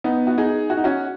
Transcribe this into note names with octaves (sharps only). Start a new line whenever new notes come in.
B3 D#4
F#4
D#4 G#4
F#4
D#4
C#4 F#4